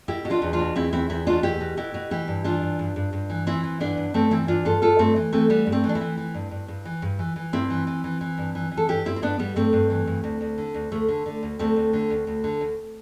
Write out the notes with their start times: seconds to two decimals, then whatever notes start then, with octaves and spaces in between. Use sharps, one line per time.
0.08 B2 E4 G4
0.25 B2
0.30 D4 F4
0.42 E2
0.53 D4 F4
0.59 B2
0.75 E2 C4 E4
0.92 E2 C4 E4
1.10 E2 C4 E4
1.27 B2 D4 F4
1.43 E2 E4 G4
1.60 B2
1.77 B2 E4 G4
1.94 B2
2.11 E3 E4 G4
2.28 G2
2.44 E3 D4 F4
2.62 G2
2.79 G2
2.96 G2
3.13 G2
3.30 E3
3.47 E3 C4 E4
3.64 E3
3.80 G2 B3 D4
3.97 G2
4.14 G2 A3 C4
4.31 E3 C4 E4
4.48 G2 D4 F4
4.65 G2 F4 A4
4.82 G2 F4 A4
4.99 G2 A3 C4
5.16 E3
5.33 E3 A3 C4
5.50 E3 G3 B3
5.67 G2
5.72 A3 C4
5.84 E3
5.89 D4
5.95 C4 E4
6.01 E3
6.17 E3
6.34 G2
6.51 G2
6.68 G2
6.85 E3
7.02 G2
7.19 E3
7.36 E3
7.53 G2 C4 E4
7.70 E3
7.87 E3
8.04 E3
8.21 E3
8.38 G2
8.55 E3
8.72 E3
8.77 A4
8.88 G2 E4 G4
9.05 G2 C4 E4
9.16 C4
9.22 G2 B3 D4
9.39 G2 G3 B3
9.56 G2 A3 C4
9.73 G2
9.90 E3
10.07 G2
10.24 D2
10.41 D2
10.58 D3
10.74 D2
10.92 D2 A3
11.08 D3
11.26 D3
11.43 D2
11.59 D2 A3 C4
11.76 D2
11.93 D3
12.10 D2
12.27 D2
12.44 D3
12.61 D2